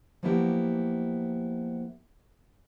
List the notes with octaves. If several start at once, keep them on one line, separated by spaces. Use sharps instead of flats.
F3 F#3 A#3 B3 E4 G4